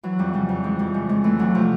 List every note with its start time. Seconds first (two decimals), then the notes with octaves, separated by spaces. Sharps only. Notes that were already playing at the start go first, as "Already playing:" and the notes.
0.03 E3 F#3
0.19 F2 G3
0.34 C#3 G3
0.49 F2
0.64 E3 G#3
0.79 F2 G3
0.94 C#3 G#3
1.09 F2 G#3
1.24 E3 A3
1.39 D2 F#3
1.54 C3 F3